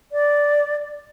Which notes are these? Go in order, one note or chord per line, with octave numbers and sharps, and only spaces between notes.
D5